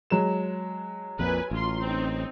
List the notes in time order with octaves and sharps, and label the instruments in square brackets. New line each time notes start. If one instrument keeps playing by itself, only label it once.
[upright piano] F#3 G#3 E7
[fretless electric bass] A#1 F2 A#2 [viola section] B4 G#5
[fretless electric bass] A1 [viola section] F4 C6
[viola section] C4 D#4